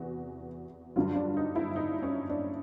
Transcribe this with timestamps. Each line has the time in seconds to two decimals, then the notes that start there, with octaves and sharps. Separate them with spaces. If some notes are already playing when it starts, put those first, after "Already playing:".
Already playing: E2 C3 E3 F#4
0.96 G2 D3 F#3 F4
1.16 D4
1.37 D#4
1.56 E4
1.76 D#4
2.03 C#4
2.29 D4